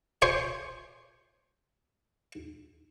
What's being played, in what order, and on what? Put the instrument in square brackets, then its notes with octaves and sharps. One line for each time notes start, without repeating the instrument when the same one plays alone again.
[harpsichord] C5 C#5 G#5